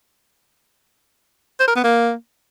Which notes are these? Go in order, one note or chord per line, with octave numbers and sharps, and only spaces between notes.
C5
A#4
B3
A#3